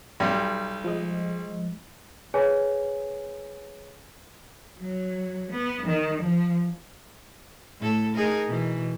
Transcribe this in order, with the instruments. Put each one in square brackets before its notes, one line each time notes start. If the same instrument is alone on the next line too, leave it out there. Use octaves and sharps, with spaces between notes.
[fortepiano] B1 G3
[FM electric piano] F3 G#3 D#5
[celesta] G#4 B4 C#5 G#5
[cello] F#3
B3
D#3
F3
[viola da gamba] A2 A4
D#4 G#4 A#4
B2 E3